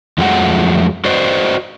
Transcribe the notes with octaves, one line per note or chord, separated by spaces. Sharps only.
F2 F3 F#3 G#3 A3 F#5
F#4 B4 C5 D5 D#5